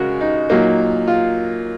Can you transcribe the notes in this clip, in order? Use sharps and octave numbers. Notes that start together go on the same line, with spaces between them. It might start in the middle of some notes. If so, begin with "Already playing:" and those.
Already playing: C#3 G#3 F#4 A#4
D#4
A#2 F#3 A#3 D#4
F4